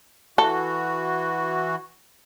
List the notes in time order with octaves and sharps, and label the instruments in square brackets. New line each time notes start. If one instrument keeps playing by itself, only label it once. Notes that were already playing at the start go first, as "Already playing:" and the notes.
[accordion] E3 F#4 [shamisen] A4